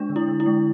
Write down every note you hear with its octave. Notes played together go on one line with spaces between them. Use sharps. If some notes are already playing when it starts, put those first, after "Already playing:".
Already playing: G#3 D4
D3
E4
D3
E4
G#3